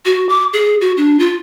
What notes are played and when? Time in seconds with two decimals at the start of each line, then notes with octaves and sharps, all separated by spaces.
0.06 F#4
0.29 D6
0.53 G#4
0.81 F#4
0.97 D4
1.19 F4